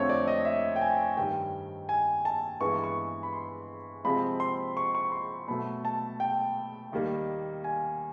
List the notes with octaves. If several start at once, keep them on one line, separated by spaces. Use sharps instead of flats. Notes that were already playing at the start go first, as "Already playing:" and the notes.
Already playing: F2 D3 F3 A3 C4 C#5
D5
D#5
E5
G5
G#5
G2 D#3 G3 G5
G#5
A5
G2 E3 G#3 B3 C#6
C#6
B5
C6
C3 F3 G#3 C4 B5
C6
C#6
C#6
C6
B2 F#3 A3 B5
A5
G5
D#2 D#3 G3 A#3
G#5